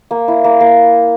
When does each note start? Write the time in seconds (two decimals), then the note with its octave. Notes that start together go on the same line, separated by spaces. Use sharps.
0.11 A#3
0.28 E4
0.44 A#3
0.60 A#3